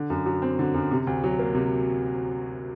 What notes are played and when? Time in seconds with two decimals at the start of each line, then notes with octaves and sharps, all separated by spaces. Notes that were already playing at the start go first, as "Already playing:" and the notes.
Already playing: D3
0.10 F#2
0.26 F#3
0.42 C4
0.59 D3
0.74 F#2
0.91 C3
1.07 D2
1.24 F#3
1.39 A#3
1.55 C3